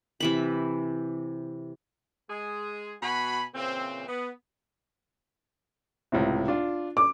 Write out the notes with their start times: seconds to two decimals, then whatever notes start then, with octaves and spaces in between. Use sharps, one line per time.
0.20 C3 E3 B5
2.29 G#3 G#4
3.01 B2 F#4 G#5 B5
3.54 A#2 C#3 E3 C4
4.07 B3
6.12 C#2 A2 C3
6.48 D4 F4
6.97 D6